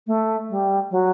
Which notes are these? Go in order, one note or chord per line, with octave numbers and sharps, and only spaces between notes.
A3
G3
F#3